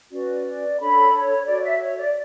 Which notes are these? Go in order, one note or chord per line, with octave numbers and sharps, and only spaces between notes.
C#4 F#4 B4 D5
D5
D4 A4 C#5 B5
C#5
F#4 A4 C#5 D5
E5
C#5
D5